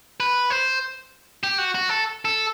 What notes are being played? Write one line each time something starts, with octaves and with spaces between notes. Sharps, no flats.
B4
C5
G4
F#4
F#4
A4
A4